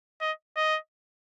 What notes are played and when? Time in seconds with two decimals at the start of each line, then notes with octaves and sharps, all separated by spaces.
0.21 D#5
0.56 D#5